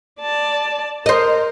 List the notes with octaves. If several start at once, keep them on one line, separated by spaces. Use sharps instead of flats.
D5 A5
A#4 C5 D#5